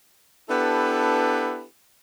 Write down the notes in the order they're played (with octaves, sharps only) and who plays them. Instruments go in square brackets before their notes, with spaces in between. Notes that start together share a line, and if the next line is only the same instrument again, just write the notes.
[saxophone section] B3 D4 E4 G4 A4 B4